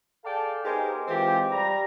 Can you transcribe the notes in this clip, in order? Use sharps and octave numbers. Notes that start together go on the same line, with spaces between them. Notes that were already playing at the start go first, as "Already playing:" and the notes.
G#4 A4 D5 F5 G5 A5
B3 D#4 G4 G#4 A#4 C5
E3 G#3 C4 F4 G4
G3 A#5